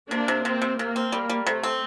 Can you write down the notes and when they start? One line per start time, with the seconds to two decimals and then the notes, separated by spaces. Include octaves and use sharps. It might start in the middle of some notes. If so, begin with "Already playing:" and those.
0.11 C3 A#3 D4
0.28 C3
0.45 C3 C4
0.62 C3
0.79 C3 A#3
0.96 C4
1.12 G3 A#3
1.30 G3
1.47 C3 A3
1.63 C4